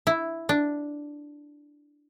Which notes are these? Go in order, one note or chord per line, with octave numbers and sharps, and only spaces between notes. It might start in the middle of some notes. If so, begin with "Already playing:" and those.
E4
D4